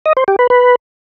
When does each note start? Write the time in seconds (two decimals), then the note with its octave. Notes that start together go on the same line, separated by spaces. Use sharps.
0.06 D#5
0.17 C5
0.28 G4
0.39 B4
0.50 B4